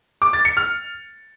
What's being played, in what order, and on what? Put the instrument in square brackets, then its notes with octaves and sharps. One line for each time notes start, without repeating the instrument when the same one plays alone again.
[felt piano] D6
A6
C#7
F6